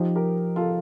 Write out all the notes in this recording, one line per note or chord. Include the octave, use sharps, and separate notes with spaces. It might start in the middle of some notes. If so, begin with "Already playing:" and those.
Already playing: F3 D#4 G4
G4 A#4
F4 A4